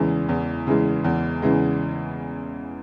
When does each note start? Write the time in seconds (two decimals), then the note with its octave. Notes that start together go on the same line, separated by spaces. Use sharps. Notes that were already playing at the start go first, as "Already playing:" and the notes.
Already playing: E2 C#3 E3 G#3
0.29 E2
0.67 C#3 E3 G#3
1.04 E2
1.42 C#3 E3 G#3